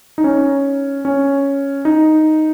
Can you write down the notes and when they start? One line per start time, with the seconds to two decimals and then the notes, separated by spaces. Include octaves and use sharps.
0.18 D#4
0.24 C#4
1.05 C#4
1.85 D#4